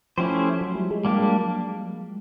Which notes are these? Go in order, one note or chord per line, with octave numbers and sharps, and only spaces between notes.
F3 A3 C#4 E4 G4 C5
F#3
G3
G#3
G3 A#3 D4 G4